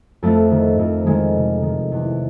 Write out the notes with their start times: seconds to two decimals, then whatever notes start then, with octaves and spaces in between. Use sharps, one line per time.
0.23 F2 A3
0.51 D#3
0.79 F2
1.06 D#3 G#3
1.35 C3
1.63 D#3
1.92 E2